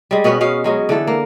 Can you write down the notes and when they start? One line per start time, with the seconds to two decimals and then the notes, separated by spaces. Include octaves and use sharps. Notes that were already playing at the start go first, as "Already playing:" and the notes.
0.11 G3 G#3
0.24 B2 B3 C#4 B4
0.41 B2 C#4 F5
0.64 F#3 G#3 C#4
0.89 D3 E3 A4
1.07 A#3